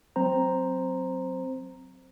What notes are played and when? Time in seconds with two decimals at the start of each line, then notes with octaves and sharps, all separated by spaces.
0.16 F#3 C4 C5 A#5